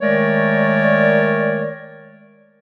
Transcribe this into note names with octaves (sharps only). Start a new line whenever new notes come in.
D#3 G#3 A3 A#4 C#5 D5